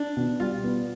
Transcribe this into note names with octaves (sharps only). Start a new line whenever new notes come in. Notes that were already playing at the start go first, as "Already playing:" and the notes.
Already playing: D4
B2
G3 F4
B3